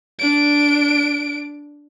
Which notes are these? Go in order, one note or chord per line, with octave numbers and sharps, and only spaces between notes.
D4 D7